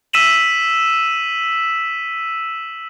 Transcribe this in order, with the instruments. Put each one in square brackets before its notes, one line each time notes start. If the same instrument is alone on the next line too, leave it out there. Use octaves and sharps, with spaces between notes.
[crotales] E6 B6 D#7 E7 F#7